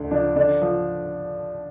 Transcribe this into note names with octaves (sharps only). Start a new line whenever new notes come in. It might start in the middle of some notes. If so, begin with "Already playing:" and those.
Already playing: D2 D3
F3 D4
D3 D4
F3